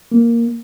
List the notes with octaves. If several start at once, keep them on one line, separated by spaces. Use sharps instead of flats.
A#3